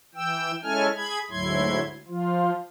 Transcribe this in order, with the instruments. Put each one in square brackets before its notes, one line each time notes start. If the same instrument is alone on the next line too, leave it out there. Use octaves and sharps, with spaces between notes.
[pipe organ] E3 G5 E6
G#3 C#4 E4 A4 G#5 F6
G#4 B5 G#6
D2 G#2 F#3 E4 C6 G#6
F3 F4